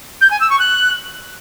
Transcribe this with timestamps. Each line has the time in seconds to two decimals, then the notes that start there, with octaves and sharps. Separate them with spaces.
0.21 G6
0.30 G#5
0.40 E6
0.49 C#6
0.59 F#6